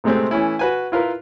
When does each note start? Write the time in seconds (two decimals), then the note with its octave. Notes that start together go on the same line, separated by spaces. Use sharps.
0.04 A2 C3 G#3 A3 C4
0.31 E3 A3 C#4 E4
0.59 F#4 B4 G#5
0.92 E4 F4 A#4 B4